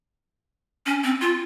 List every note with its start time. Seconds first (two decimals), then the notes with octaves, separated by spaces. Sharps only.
0.86 C#4
1.03 C4
1.21 F4